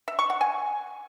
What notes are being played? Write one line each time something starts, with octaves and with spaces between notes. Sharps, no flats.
E5
C#6
F#5
G#5